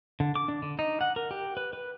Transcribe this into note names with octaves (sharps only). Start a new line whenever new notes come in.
D3
D6
D4
D3
D#4
F#5
A#4
G4
B4
B4